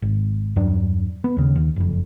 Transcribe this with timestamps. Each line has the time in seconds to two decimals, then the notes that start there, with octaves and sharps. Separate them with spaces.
0.02 G#1
0.56 E2 G2 F#3 D4
1.24 B3
1.37 D#2 C#3
1.56 D#2
1.76 F#1 F2